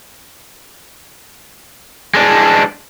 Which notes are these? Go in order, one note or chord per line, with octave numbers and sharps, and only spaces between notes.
G#3 D4